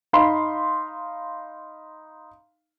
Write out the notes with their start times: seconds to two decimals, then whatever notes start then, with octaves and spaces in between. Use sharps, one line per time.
0.13 D#4 F5 B5 C6